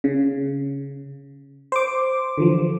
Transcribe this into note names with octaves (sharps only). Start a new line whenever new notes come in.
C#3
C5 D6
D3 E3 F3